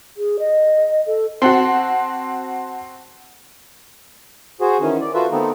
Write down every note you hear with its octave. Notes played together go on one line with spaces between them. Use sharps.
G#4
D#5
A4
C4 F#4 F#5 A5 C6
F#4 G#4 C5
D#3 E3 C#4
D5
F4 F#4 A4 B4 C5 E5
D#3 A3 B3 C4 D#4